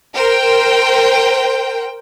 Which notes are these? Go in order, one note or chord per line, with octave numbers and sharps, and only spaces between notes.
A#4 C5 G5